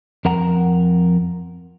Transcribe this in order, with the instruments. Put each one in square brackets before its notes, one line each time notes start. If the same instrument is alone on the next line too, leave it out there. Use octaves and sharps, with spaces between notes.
[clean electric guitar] F2 A#4 F#5 A#5